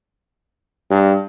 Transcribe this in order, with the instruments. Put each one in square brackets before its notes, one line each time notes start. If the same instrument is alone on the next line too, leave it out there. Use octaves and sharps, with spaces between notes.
[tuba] G2